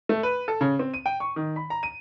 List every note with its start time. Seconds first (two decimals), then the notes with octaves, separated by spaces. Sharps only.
0.09 A3
0.23 B4
0.48 A4
0.61 C#3
0.79 C4
0.94 D#7
1.06 G5
1.20 C#6
1.36 D#3
1.56 B5
1.70 A#5
1.83 D#7